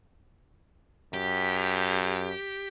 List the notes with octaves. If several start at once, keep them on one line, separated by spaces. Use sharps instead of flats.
F#2 G4